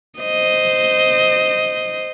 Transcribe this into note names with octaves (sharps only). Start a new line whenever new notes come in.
C5 D#5